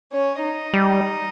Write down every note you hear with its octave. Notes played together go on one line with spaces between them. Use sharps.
C#4 C#5
D#4 D#5
G3